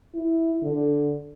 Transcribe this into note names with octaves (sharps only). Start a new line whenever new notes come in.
E4
D3